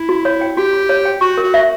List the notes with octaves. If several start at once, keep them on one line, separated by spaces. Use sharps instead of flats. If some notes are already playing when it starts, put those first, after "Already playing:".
Already playing: E4
F#4
C#5
G5
F#4 G4
F#4
C#5
G5
F#4 C#6
A#4
F#4
E5